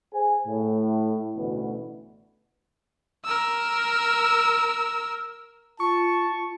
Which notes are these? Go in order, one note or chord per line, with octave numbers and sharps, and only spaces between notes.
G#4 C5 G#5
A2
A1 D2 B2
A#4 E6
F4 A5 C#6